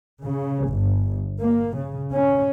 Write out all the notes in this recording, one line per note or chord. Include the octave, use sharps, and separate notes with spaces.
C#3
G1
A#3
C#3
C#4